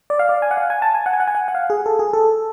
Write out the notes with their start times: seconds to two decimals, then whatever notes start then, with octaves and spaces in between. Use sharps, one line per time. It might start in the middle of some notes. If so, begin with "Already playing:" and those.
0.10 D5
0.19 F5
0.29 D5
0.42 G#5
0.51 F#5
0.57 F5
0.70 G#5
0.82 A5
0.95 G#5
1.06 F#5
1.13 G#5
1.20 F#5
1.28 G#5
1.35 F#5
1.48 F#5
1.55 F5
1.70 G#4
1.86 A4
1.99 G#4
2.13 A4